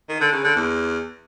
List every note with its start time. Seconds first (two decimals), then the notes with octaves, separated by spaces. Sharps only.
0.09 D#3
0.21 D3
0.32 C#3
0.44 D3
0.56 E2